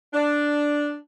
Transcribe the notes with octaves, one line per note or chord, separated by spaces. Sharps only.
D4